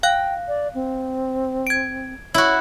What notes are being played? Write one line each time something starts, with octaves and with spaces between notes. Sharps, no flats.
F5 G5 F#6
D5
C4
G#6 D7
E4 F#4 C#5